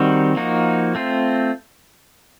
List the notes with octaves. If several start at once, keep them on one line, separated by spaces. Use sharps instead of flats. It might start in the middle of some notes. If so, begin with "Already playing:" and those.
Already playing: D#3 G3 C4 D#4 F#4
F3 A#3 D#4 F#4
A3 C4 F4